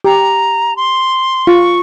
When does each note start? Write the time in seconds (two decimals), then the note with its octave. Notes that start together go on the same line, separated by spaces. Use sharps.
0.04 G4 A#5
0.76 C6
1.47 F4 C#6